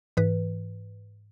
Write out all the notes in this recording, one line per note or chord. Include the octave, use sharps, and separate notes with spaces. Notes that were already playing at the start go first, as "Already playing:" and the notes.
G#2 E3 B4